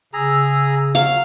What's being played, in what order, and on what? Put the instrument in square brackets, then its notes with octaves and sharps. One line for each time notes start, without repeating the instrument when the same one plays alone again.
[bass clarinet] C#3 [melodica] G#4 A#5 [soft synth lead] E6
[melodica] F#3 [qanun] F5